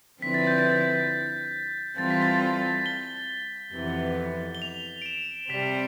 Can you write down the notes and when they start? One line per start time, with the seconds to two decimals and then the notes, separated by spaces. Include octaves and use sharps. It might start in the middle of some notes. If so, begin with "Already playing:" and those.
0.22 D3 F3 C4 E4 B4 B6
0.34 A6
0.47 G6
0.59 A6
1.98 E3 G3 C4 F4 A4 A6
2.10 B6
2.22 A6
2.86 G7
3.74 F2 C3 E3 B3
4.55 G7
4.62 F7
5.02 D7
5.06 E7
5.50 C3 G3 C4 B6